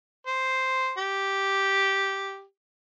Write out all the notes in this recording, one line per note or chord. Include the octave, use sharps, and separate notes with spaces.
C5
G4